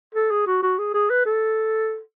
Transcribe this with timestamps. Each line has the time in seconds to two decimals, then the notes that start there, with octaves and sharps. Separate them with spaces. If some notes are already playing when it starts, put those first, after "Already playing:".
0.15 A4
0.31 G#4
0.47 F#4
0.62 F#4
0.78 G#4
0.94 G#4
1.10 B4
1.26 A4